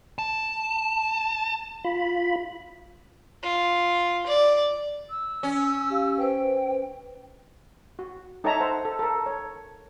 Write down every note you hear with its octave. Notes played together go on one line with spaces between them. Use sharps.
A5
F4 B5
F4
D5
E6
C#4
G4 F5
B4 C5 G5
F#4
D#4 A4 C#5 E5 A5 A#5
C5 F#5
A4
A4 A#4
C#5